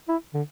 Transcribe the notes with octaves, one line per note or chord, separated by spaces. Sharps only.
E4
D3